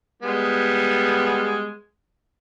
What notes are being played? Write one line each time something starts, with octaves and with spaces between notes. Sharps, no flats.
G3 G#3 B3